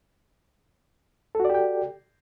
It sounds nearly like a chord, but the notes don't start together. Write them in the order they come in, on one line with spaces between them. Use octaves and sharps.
A4 F#4 D5 G4 G5